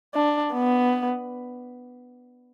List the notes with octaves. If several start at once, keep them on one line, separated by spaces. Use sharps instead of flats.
D4
B3